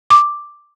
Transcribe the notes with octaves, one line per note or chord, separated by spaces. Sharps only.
D6